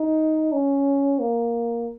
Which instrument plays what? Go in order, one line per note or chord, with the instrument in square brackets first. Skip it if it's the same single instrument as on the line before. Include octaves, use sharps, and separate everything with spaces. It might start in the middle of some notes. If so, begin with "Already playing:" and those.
Already playing: [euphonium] D#4
C#4
A#3